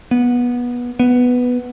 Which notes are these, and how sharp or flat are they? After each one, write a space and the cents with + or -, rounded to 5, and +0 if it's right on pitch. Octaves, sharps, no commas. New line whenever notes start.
B3 -20
B3 +0